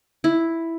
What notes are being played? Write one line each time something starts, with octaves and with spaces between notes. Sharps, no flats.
E4